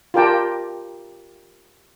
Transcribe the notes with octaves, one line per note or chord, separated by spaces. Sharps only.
F4 G4 A#4 D5 G5 A5